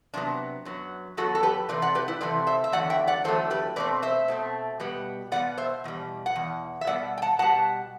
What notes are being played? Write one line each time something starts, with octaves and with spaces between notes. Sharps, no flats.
C3 F#3 B3 D4
F#2 F#3 B3
F#2 F#3 B3 F#4 A4
A4
G4 B4
C3 E3 A3 C4 B4 D5
D5 F#5
G4 B4
E4
C3 E3 A3 C4 B4 D5
C5 E5
E5
E2 D3 F#3 A3 D5 F#5
E5 G5
D5 F#5
E2 D3 F#3 A3 A4 C5
G4 B4
B2 A3 C4 B4 D5
C5 E5
B2 A3 C4
B2 G3 B3
B2 G3 B3 D5 F#5
C5 E5
E2 B2 G3
F#5
E2 B2
E5
B2 G3 B3 D5 F#5
G5
F#5 A5
B2 G3 B3 F#5 A5